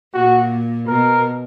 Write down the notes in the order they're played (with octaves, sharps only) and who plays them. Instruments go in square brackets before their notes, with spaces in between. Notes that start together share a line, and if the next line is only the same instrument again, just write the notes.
[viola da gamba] A#2 [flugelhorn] F#4
[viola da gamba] B2 [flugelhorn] A#4